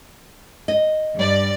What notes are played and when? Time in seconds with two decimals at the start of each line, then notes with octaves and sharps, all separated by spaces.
0.68 D#5
1.15 G2 D5